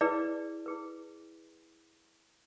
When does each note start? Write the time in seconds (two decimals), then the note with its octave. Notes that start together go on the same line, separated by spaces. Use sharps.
0.01 E4 G#4 B4 D5
0.66 E4 G#4 B4